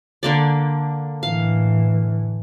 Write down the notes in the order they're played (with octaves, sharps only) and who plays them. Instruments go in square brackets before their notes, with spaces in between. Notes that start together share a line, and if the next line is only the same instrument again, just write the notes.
[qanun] D3 A#3 D5
[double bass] A2 E3 [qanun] F5